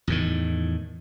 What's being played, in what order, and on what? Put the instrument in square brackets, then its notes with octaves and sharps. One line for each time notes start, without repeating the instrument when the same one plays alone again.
[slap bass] E2 A2 D#3